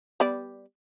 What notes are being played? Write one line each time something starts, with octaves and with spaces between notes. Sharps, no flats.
G3 B3 D5